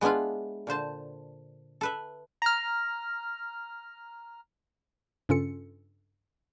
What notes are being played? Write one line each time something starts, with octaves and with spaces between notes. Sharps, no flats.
G#3 B3 D4 E4 F4
A#2 D3 C5 A5
A4 B4 E5
A#5 F6
G2 C#3 C#4 F4 A4 C#7